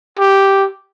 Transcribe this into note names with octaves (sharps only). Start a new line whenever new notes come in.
G4